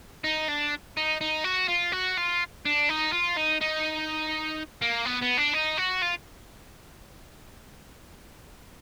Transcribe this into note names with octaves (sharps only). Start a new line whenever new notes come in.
D#4
D4
D#4
D#4
F#4
F4
F#4
F4
D4
D#4
F4
D#4
D#4
A#3
B3
B3
D4
D#4
F#4
F4